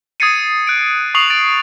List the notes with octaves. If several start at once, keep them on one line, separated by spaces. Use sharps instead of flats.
D#6 G#6 A6 C7 C#7 D#7
F#6 D7
C#6 D#6 C7 F7 F#7
A6 D7